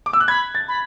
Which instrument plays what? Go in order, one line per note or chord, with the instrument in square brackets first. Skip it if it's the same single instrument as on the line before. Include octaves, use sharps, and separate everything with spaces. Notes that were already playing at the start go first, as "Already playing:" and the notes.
[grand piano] D6
E6
F#6
[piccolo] B5 [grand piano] G#6
[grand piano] A6
[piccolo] B5